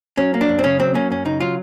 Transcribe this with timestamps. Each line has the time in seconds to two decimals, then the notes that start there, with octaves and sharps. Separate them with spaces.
0.17 F#3 C#4
0.34 A#3
0.41 D4
0.49 F#2
0.59 C4
0.64 C#3 C#4
0.80 F#3 C4
0.94 A#3 C#4
1.10 F#2 C#4
1.25 C#3 D#4
1.40 F#3 F4